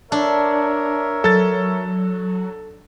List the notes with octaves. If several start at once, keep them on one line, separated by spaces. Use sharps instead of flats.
D4 A#4 C#5 E5
F#3 A4 A6